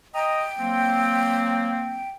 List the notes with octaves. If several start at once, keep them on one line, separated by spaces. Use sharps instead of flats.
D#5 G5 A#5 D#6
F#3 A#3 C4